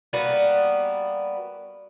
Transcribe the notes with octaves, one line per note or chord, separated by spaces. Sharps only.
G3 A#3 B3 F#4